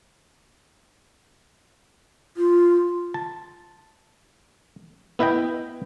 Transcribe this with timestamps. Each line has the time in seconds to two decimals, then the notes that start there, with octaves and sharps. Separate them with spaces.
2.37 F4
3.14 A5
5.19 B3 E4 B4 D#5 G5